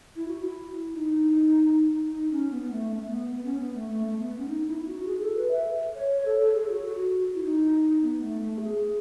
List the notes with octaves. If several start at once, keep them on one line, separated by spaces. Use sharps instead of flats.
E4
F#4
E4
D#4
D#4
C#4
B3
B3
A3
A3
A3
B3
B3
C#4
B3
A3
A3
A3
B3
C#4
D#4
E4
E4
F#4
G#4
A4
B4
E5
C#5
A4
A4
G#4
F#4
F#4
E4
D#4
B3
A3
A3
G#4